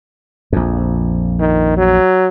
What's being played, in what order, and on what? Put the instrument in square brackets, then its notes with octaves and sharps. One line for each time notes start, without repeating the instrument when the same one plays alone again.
[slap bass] A#1 F2
[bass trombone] D#3
F#3